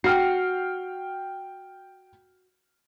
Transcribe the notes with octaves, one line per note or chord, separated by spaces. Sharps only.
F#4 G5 F6 C7